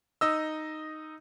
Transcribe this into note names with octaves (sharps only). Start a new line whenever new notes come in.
D#4 D#5 E6